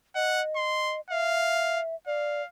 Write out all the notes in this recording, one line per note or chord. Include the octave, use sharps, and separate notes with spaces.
D#5 F#5
C6
E5 F5
D5 F5